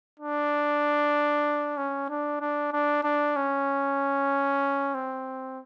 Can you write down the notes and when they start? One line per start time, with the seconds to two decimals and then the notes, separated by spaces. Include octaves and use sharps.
0.20 D4
1.77 C#4
2.09 D4
2.41 D4
2.73 D4
3.04 D4
3.36 C#4
4.95 C4